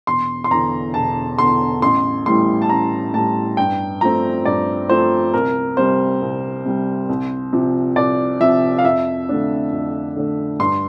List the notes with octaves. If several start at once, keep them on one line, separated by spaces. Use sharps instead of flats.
E1 C6
C6
E2 D3 A#5
E1 A5
E2 D3 C6
A1 C6
A2 E3 G3 C6
A5
A1 A#5
A2 E3 G3 A5
G2 G5
F3 A3 C4 A#5
G2 D5
F3 A3 C4 C5
C2 A#4
C3 G3 C5
C2
C3 G3
C2
C3 F3
C2 D5
C3 F3 E5
F5
F2 E5
D3 A3 D4
F2
D3 A3 D4
G2 C6